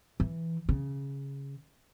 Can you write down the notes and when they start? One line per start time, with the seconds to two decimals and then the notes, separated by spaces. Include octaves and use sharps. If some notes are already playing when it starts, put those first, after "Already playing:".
0.20 E3
0.69 C#3